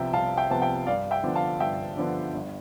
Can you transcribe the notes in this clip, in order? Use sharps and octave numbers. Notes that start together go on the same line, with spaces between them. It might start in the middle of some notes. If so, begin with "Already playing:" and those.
Already playing: C2 C3 F3 B3 E5 G5
C2 F5 A5
E5 G5
C3 F3 B3 A5
E5 G5
G2 D5 F5
E5 G5
D3 F3 B3 D4
F5 A5
G2 E5 G5
D3 F3 B3 D4
G1